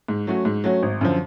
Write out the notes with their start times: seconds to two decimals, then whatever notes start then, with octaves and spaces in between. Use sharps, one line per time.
0.08 G#2
0.27 F#3 A3 C#4 F#4
0.45 G#2
0.64 F#3 A3 C#4 F#4
0.82 G#1
1.01 F#2 D3 F3